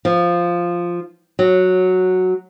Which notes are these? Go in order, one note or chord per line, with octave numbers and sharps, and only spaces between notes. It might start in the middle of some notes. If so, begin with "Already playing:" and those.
F3
F#3